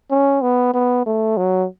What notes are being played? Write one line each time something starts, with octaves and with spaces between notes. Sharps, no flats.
C#4
B3
B3
A3
F#3